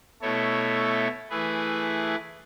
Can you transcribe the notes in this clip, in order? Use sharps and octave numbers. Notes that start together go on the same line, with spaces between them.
B2 A3 E4 A4 C#5
E3 A3 E4 G#4 B4